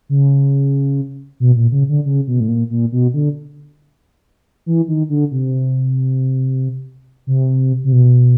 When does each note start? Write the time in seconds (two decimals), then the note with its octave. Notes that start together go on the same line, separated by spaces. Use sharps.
0.09 C#3
1.40 B2
1.56 A#2
1.72 C#3
1.89 D3
2.05 C#3
2.27 B2
2.40 A2
2.48 A#2
2.70 A#2
2.92 B2
3.14 D3
4.66 E3
4.88 D#3
5.09 D3
5.31 C3
7.27 C3
7.84 C3
7.92 B2